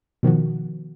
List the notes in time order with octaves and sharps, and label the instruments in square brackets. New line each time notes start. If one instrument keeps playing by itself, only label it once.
[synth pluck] B2 D#3 F3 F#4